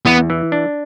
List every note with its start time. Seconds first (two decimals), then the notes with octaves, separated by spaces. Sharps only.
0.06 E2 B3
0.30 E3
0.52 D4